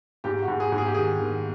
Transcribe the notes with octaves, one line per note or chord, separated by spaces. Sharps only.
G#2 G4
F#4
G#2
G#4
G#2
G#4
G4
D#3 G#4
D#3